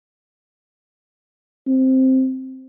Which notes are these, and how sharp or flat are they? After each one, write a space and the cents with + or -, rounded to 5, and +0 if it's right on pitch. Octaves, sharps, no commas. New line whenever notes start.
C4 +0